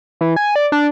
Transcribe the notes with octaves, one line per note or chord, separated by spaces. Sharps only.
E3
G#5
D5
D4